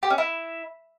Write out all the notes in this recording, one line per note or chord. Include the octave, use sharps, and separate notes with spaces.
G4
C#4
E4